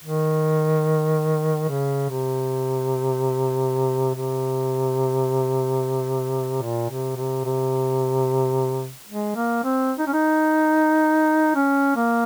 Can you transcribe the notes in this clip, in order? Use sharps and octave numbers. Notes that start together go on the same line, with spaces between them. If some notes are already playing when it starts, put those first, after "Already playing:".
D#3
C#3
C3
C3
A#2
C3
C3
C3
G#3
A#3
C4
D#4
C#4
D#4
C#4
A#3